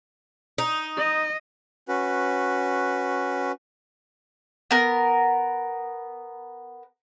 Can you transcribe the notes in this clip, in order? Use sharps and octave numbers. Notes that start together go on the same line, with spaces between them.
D#4
D#5
C#4 F#4 B4
B3 A#4